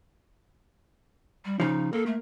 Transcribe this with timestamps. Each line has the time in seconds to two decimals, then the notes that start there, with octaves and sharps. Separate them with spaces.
1.45 G3
1.60 C#3 F3 D#4
1.93 A#3 A4
2.06 A3